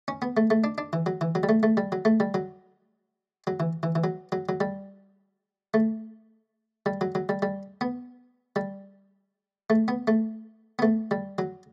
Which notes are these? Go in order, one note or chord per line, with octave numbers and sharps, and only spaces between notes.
C#4
B3
A3
A3
D4
D4
E3
F#3
E3
F#3
G3
A3
A3
G3
F#3
A3
G3
F#3
F#3
E3
E3
E3
F#3
F#3
F#3
G3
A3
G3
F#3
F#3
G3
G3
B3
G3
A3
B3
A3
B3
A3
G3
F#3